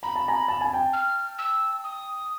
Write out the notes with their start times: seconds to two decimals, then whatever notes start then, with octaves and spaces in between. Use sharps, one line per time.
0.03 A#5 B5
0.16 A5
0.28 G#5 A#5
0.48 A5
0.61 G#5
0.73 G5 A5
0.93 F6
1.38 E6
1.84 D#6